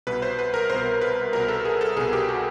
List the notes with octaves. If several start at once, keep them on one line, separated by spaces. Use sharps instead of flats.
C2 B2 B4
C5
B4
A#4
C2 B2 C5
B4
C2 B2 A#4
A4
G#4
A4
C2 B2 G#4
G4
F#4